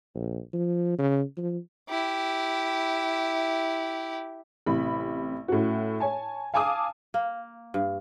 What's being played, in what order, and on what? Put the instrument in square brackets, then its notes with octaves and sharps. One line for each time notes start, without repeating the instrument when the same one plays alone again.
[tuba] A#1
F3
C#3
F3
[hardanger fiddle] E4 G4
[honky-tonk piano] A1 C3 B5
A2 C#4 F#4
C#5 G#5 A5
F5 G#5 A5 D6 D#6
[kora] A#3
G2